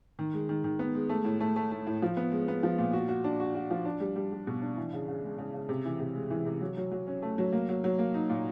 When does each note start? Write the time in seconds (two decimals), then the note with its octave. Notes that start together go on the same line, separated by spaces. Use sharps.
0.19 D#3
0.33 G#3
0.49 D#3
0.64 D#3
0.79 B3
0.95 G#3
1.09 A3
1.25 A2
1.40 A3
1.56 A3
1.72 A3
1.87 A2
2.02 F3
2.17 B3
2.32 G#3
2.48 B3
2.63 F3
2.78 A#2
2.93 F#4
3.08 F#4
3.24 D4
3.40 F#4
3.55 F#4
3.70 F3
3.85 D4
4.00 G3
4.16 G3
4.32 G3
4.47 B2
4.62 D4
4.77 E3
4.93 C#3
5.08 C#3
5.24 G#3
5.38 C#3
5.54 C#3
5.69 C3
5.85 E3
6.00 C3
6.15 G#3
6.30 E3
6.46 C3
6.61 F#3
6.77 F#3
6.92 F#3
7.07 C#4
7.22 A3
7.38 F#3
7.52 A#3
7.69 F#3
7.84 F#3
7.99 A#3
8.14 D#4
8.29 A#2